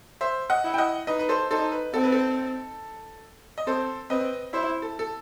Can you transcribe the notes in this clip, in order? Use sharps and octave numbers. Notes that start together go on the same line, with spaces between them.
C5 E5
D#5 F#5
E4
G5
D#5 F#5
D#4 B4 D#5
B4
A4 C5
D#4 A4 C5
B4
C4 A4
B4
A4
D#5
C4 A4 C5
C4 B4 D#5
E4 C5 E5
A4
A4